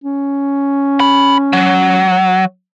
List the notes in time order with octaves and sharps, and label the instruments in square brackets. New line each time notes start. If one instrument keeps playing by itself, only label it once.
[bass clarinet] C#4
[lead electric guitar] B5
F#3